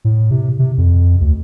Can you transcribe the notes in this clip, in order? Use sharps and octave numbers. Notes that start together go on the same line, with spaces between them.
A2
C3
C3
F2
D2